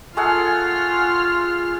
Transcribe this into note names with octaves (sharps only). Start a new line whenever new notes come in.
A3 F4 G#4 F#5 F6